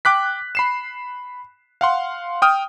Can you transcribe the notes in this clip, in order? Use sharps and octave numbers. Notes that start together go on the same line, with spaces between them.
G5 D6 F#6 B6
B5 C7 E7
F5 F#5 C6
G5 D#6 F6